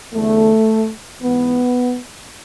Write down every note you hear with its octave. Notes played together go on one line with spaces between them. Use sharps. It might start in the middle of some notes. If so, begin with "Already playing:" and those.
E2 D3 A3
G#2 E3 B3